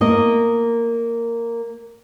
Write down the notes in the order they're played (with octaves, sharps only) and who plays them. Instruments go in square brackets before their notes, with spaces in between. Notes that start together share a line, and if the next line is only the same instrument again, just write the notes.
[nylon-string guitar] A#3 D#5